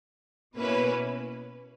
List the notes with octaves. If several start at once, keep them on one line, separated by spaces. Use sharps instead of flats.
B2 A#3 C#4 E4 B4